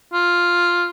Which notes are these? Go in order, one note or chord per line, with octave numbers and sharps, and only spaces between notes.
F4